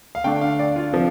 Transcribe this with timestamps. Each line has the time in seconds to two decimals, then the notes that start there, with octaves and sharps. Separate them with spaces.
0.15 F5
0.24 D3 A3 D4 G5
0.41 F5
0.59 D5
0.76 F4
0.92 C3 F3